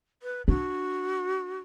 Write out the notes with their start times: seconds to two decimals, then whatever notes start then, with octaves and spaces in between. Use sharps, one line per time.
0.23 B4
0.48 D4 F#4